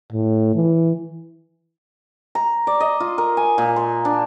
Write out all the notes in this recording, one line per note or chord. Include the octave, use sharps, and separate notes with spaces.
A2
E3
A#5
D5
D#5
F4
A#4
G#5
A#2
C6
D4